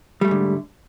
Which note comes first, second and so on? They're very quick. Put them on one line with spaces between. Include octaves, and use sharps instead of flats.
G3 A3 G#2 D3